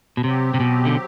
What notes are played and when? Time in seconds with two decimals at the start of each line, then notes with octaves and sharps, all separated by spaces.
0.17 B2
0.24 C3 F#3 C4 G4
0.54 C3
0.60 B2
0.85 D3